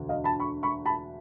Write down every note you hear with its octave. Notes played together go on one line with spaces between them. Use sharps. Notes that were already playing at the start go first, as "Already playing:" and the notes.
Already playing: E1 D2 D3
D#5 F5
A5 B5
B5 C#6
B5 C#6
A5 B5